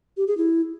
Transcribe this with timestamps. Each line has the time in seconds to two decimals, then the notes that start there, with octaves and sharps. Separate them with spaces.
0.17 G4
0.27 G#4
0.37 E4